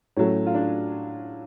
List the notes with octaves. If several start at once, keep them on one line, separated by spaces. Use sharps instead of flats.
A2 F#3 A3 C#4
F4
D4